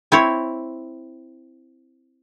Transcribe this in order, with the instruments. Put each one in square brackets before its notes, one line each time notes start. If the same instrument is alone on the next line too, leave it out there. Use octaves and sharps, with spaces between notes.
[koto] C4 E4 C#5